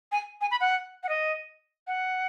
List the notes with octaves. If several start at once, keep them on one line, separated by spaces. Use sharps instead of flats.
G#5
G#5
B5
F#5
F#5
D#5
F#5